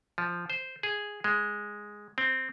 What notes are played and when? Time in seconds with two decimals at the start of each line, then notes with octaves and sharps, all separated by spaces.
0.18 F3
0.50 C5
0.83 G#4
1.24 G#3
2.18 C4